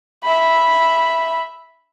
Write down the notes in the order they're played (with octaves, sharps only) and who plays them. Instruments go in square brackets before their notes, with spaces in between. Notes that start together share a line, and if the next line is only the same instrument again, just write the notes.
[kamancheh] E5 B5